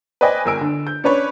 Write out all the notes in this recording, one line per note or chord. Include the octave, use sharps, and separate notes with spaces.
B4 C5 D5 D#5 G5 G#5
G1 A#4 G#5 E6 D7
D3
G6
C#4 D4 B4 C#5